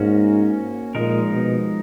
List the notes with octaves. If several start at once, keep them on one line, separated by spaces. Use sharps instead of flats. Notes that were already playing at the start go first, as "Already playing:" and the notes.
Already playing: G#2 A#3 C#4 F#4 C#5
A#2 F3 G#3 D#4 A#4
B2